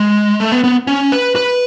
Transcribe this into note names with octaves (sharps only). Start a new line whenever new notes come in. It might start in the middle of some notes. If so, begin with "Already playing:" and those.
Already playing: G#3
A3
B3
B3
C#4
B4
B4